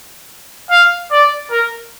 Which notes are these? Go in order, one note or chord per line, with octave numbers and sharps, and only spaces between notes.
F5
D5
A#4